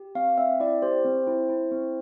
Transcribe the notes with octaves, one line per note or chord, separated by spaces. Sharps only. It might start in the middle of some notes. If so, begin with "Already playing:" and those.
Already playing: G4
C4 F5
C4 E5
E4 D5
G4 C5
C4
E4
E4
C4